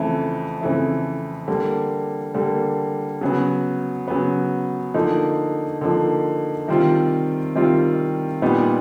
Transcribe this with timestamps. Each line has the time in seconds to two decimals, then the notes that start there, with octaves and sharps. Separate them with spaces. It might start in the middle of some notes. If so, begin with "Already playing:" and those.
Already playing: F2 C#3 E3 A3
0.61 F2 C#3 E3 A3
1.48 D3 G3 A#3
2.34 D3 G3 A#3
3.21 C#3 F#3 B3
4.08 C#3 F#3 B3
4.94 D3 F3 A#3 D#4
5.81 D3 F3 A#3 D#4
6.68 C3 D#3 G3 C4 F4
7.55 C3 D#3 G3 C4 F4
8.42 A#2 G3 B3 D#4